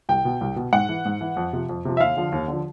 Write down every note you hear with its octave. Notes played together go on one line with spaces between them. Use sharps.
C2 G5
B2
C2
B2
G#2 F#5
E3
G#2
E3
F2
C3 F3
F2
C3 F3
E5
D#2 F5
D3 F3
D#2
D3 F3